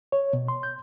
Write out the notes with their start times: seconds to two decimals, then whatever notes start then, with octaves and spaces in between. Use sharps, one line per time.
0.12 C#5
0.33 B2
0.48 C6
0.63 G6